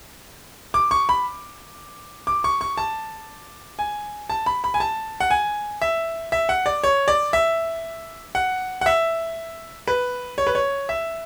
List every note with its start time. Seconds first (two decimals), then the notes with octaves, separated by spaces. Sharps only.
0.74 D6
0.91 C#6
1.09 B5
2.27 D6
2.44 C#6
2.61 C#6
2.77 A5
3.79 G#5
4.30 A5
4.46 B5
4.64 B5
4.74 G#5
4.80 A5
5.20 F#5
5.31 G#5
5.82 E5
6.32 E5
6.49 F#5
6.66 D5
6.83 C#5
7.08 D5
7.33 E5
8.35 F#5
8.81 F#5
8.86 E5
9.88 B4
10.38 C#5
10.47 B4
10.55 C#5
10.89 E5